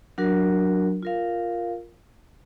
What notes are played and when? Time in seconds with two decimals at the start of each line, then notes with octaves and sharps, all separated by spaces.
0.18 F#3 D4 F#4 A#4
1.03 F4 A#4 F5